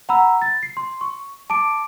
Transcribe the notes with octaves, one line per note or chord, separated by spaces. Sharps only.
F#5 A#5 B5 E6
A6
C7
C6
C#6
A5 D6 D7